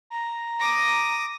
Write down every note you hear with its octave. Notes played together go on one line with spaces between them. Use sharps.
A#5
D6 D#6 A#6